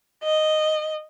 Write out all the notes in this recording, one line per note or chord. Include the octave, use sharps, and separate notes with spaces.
D#5